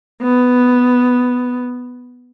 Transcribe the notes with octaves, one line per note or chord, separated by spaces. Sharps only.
B3